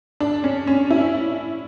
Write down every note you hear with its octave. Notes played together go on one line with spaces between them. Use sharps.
D4
C#4
C#4
E4